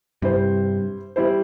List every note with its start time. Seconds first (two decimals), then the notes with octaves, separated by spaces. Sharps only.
0.22 G2 C3 G3 E4 C5
1.16 G3 E4 C5